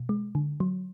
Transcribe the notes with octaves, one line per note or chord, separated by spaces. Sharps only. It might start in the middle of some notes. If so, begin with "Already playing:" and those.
Already playing: B2
G#3
D3
F#3